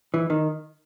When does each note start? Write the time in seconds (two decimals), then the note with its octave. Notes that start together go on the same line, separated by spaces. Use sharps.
0.14 E3
0.30 D#3